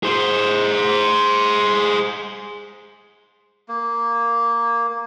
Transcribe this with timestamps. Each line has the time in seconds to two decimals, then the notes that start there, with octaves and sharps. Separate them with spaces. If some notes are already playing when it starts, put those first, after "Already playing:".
0.03 G#4 C5
3.68 A#3